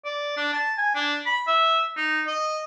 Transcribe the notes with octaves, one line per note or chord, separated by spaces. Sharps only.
D5
D4
A5
G#5
D4
B5
E5
D#4
D#5